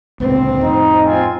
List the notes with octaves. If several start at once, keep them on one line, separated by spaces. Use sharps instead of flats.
C#2 A#2 D3 C4
F2 A2 D#4
C4 F4 G#5